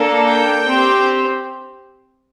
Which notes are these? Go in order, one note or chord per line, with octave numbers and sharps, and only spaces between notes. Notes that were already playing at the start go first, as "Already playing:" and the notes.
Already playing: A#3 D4 A4
G5
C4 G4